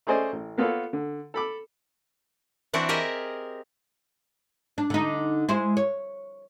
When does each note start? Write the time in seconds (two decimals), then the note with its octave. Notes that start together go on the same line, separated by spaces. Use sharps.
0.07 A3 C#4 G#4 C5 D5 D#5
0.32 A1
0.58 A#3 B3 F4 A4 C#5 F5
0.93 D3
1.34 A4 B5 D6
2.73 E3 C4 D4 E4 F#4
2.89 G4 G#4 A#4 D#5 E5
4.78 D4
4.90 D3 D#4
5.49 G#3 E4 C5
5.77 C#5